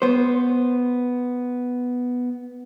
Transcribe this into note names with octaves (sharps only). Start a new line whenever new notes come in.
B3 C5